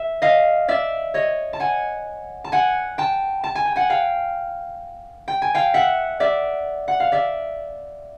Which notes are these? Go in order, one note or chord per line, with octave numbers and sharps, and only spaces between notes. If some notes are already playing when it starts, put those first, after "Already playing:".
Already playing: E5
D#5 F5
D5 E5
C#5 D#5
A5
F#5 G#5
A5
F#5 G#5
G5 A5
A5
G#5
G5
F#5 G#5
F5 G5
G5
G#5
F5 G5
E5 F#5
D5 E5
F#5
F5
D5 E5